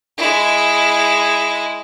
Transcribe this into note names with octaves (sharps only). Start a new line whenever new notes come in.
G#3 E4